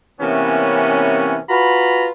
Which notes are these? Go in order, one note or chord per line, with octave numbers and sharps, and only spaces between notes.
C3 E3 A#3 B3 C#4
F4 F#4 B4 A#5 B5